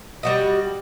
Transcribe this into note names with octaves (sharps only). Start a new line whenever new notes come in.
G3 F#4 D#5